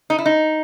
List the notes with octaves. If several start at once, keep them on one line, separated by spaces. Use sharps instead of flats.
D#4
E4
D#4